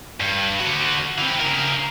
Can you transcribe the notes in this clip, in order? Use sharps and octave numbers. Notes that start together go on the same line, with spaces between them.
G2
D3 F#4
E3 C4
C#3 A#4